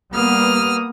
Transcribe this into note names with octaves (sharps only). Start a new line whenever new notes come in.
G3 A#3 B3 D#6 F6